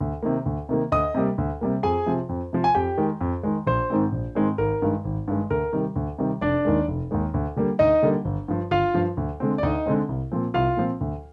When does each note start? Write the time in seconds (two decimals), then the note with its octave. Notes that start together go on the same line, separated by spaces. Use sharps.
0.01 D2
0.23 C3 D#3 A#3
0.46 D2
0.69 C3 D#3 A#3
0.92 D2 D#5 D#6
1.14 C3 G3 A#3
1.38 D2
1.61 C3 G3 A#3
1.83 F2 G#4 G#5
2.06 C3 F3
2.29 F2
2.53 C3 F3
2.64 G#5
2.75 F2 G4 G5
2.98 D#3 G#3
3.21 F2
3.43 D#3 G#3
3.67 A#1 C5
3.90 G#2 D#3 G#3 C4
4.12 A#1
4.35 G#2 D#3 G#3 C4
4.58 G#1 A#4
4.82 G2 D#3 G#3
5.05 G#1
5.28 G2 D#3 G#3
5.50 D2 A#4
5.73 C3 D#3 G3
5.96 D2
6.18 C3 D#3 G3
6.41 F1 D4 D5
6.65 D#2 D#3 G#3
6.88 F1
7.11 D#2 D#3 G#3
7.34 D2
7.56 D3 G3 A#3
7.79 D2 D#4 D#5
8.02 D3 G3 A#3
8.25 G1
8.48 G2 F3
8.71 G1 F4 F5
8.94 G2 F3
9.17 D2
9.40 D3 G#3 C4
9.58 D5
9.63 D2 D#4 D#5
9.86 D3 G#3 C4
10.09 C2
10.32 A#2 F3 C4
10.54 C2 F4 F5
10.77 A#2 F3 C4
11.01 D2